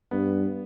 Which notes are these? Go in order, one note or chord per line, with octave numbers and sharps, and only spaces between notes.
G2 B3